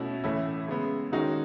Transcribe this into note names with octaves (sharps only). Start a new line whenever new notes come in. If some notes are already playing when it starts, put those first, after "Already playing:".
Already playing: B2 A3 C#4 E4
A2 E3 A3 C#4 E4
C#3 G#3 B3
D#3 G#3 C#4 D#4 F#4